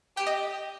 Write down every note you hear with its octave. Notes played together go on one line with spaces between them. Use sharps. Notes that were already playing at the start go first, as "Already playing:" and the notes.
G4 G5
D#5